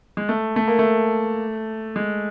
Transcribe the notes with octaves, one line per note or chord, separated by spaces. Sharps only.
G#3
A3
A3
A#3
A3
G#3